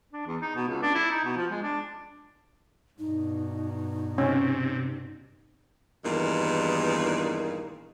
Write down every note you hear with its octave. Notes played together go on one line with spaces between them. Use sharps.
D4
E2
D#4
B2
C#2
D4
E4
D#4
B2
F3
G#3
D4
G2 B2 D#4
C3 C#4
E2 G2 A#2 D#3